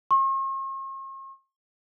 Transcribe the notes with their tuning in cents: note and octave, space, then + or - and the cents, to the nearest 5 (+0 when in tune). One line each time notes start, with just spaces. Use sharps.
C#6 -45